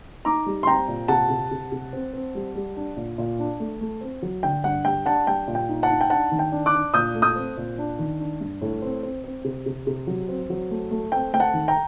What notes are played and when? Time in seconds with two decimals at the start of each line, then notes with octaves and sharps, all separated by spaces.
0.25 D#4 A#5 D6
0.46 G3
0.63 C6
0.67 C4 G5 A#5
0.88 A#2
1.08 C3 F#5 A5
1.30 C3
1.51 C3
1.72 C3
1.93 C4
2.13 C4
2.35 G3
2.55 G3
2.76 D4
2.97 A#2
3.18 A#2
3.39 D4
3.60 A3
3.81 A3
4.01 C4
4.22 F#3
4.43 D3 G5
4.64 G2 F#5
4.85 G3 G5
5.06 D4 F#5 A5
5.27 G3 G5
5.48 A#2
5.55 G5
5.69 D#4
5.83 F#5 A5
5.90 D#4
6.01 G5
6.10 D4 F#5 A5
6.31 D#3
6.39 G5
6.52 D4
6.66 D6 F#6
6.73 D4
6.94 A#2 D#6 G6
7.15 A3
7.22 D#6 G6
7.36 C4
7.57 A#2
7.78 D4
7.99 D#3
8.20 D4
8.41 G2
8.61 A2
8.82 C4
9.03 C4
9.24 C4
9.44 C3
9.66 C3
9.87 C3
10.07 F#3
10.29 C4
10.50 F#3
10.71 A3
10.91 A3
11.12 C4 G5
11.33 A3 G5
11.40 F#5 A5
11.53 D#3
11.68 G5 A#5